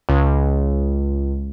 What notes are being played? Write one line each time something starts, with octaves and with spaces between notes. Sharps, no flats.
C#2